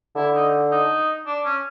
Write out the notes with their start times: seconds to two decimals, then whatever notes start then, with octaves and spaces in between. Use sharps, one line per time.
0.15 D3 E4
0.34 D#4
0.71 D#4
1.27 D4
1.44 C#4